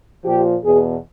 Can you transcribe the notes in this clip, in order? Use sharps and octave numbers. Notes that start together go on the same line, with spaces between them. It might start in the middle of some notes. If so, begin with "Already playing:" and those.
A#2 F3 G4
E2 B2 G#4